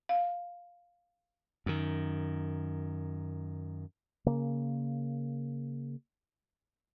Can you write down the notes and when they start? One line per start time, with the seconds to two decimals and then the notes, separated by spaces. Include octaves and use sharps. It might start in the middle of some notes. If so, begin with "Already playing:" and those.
0.09 F5
1.66 F#2 D#3
4.26 C#3 A#3